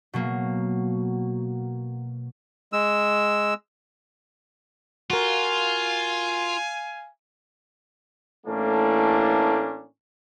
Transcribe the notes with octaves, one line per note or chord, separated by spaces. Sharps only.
B2 F#3 A#3
G#3 E6
F4 F#4 A#4 F5 G#5
A2 E3 A3 A#3 C#4 D4